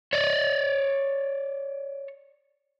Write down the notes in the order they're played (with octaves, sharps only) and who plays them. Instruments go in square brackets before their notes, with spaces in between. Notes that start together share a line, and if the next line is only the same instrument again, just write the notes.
[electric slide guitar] C#5 D5